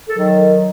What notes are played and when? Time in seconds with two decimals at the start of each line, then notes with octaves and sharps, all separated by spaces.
0.09 A4
0.19 D#3 F#3